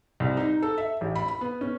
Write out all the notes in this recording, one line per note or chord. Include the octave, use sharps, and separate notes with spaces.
C2
D#4
A4
E5
A1
B5
B5
B3
C#4